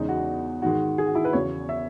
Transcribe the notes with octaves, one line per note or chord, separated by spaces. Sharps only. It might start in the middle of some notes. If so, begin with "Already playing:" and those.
Already playing: E2 C#3 G#3 D#4
F#4
G#2 D#3 G#3 F#4
G#4
F#4
E4
B4
E2 C#3 F#3 C#5
E5